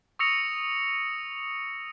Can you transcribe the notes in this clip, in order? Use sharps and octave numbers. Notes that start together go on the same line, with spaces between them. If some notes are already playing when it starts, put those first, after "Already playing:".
C#6 D#6 E6 A#6 C#7 F7